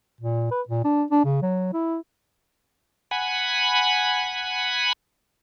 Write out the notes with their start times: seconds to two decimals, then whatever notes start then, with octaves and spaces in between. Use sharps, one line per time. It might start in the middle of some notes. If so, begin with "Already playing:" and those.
0.20 A#2
0.51 B4
0.68 A#2
0.84 D4
1.11 D4
1.24 C#3
1.42 F#3
1.73 E4
3.11 F#5 G#5 B5